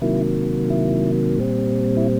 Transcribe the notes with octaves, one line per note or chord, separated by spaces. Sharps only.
C3 D#3 F#3 A#3 E4
E4
A#2 G3 C4
E4